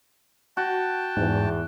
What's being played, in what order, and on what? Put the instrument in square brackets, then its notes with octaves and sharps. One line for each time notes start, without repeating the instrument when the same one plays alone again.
[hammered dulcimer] F#4 [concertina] G5 A5
[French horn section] E2 [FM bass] G#2